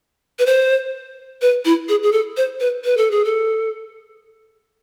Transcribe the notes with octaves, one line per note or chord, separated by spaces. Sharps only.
B4
C5
B4
E4
G#4
G#4
A4
C5
B4
B4
A4
G#4
A4